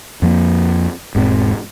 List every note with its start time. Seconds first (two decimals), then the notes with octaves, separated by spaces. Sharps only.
0.22 F2 F3 A#3
1.15 E1 G#2 A3 C4